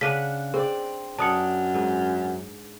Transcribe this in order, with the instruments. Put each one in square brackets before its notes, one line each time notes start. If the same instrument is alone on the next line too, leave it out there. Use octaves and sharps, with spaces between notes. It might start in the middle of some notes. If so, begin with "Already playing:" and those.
[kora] C#3 D4 F#5 [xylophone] B6 D#7
[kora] C4 D5 [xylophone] G#4
[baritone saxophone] F#2 [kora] D4 D5 [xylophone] A5 D#6 C#7
[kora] G#2